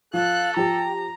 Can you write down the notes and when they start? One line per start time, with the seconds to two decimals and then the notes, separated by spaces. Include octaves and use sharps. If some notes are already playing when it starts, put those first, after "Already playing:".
0.14 F3 A4 F5 F#6
0.57 F3 G4 G5 A#5